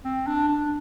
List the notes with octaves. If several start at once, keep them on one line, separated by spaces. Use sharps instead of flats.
C4
D4
D4